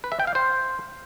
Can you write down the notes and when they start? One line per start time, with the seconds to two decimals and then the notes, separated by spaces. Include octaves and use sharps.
0.04 B4
0.12 E5
0.20 G5
0.27 F5
0.35 C5